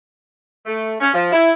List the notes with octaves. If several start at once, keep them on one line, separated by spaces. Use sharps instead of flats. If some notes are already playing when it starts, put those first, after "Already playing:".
A3
C#4
F3
E4